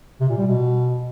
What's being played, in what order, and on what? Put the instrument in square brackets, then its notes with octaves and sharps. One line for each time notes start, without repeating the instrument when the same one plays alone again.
[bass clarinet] C3
A#2
G3
B2